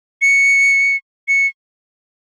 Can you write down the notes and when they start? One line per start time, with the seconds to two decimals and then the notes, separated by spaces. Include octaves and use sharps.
0.22 C#7
1.28 C#7